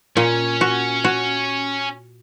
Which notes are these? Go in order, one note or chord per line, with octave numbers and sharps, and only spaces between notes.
A#2 C#4
F#4
F#4